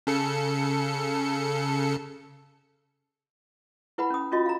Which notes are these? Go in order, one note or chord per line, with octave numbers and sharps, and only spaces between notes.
C#3 A4 C#7
E4 B4 F#5 B5
C#4 D#6
C#4 F4 F#4 D#5
F5 A#5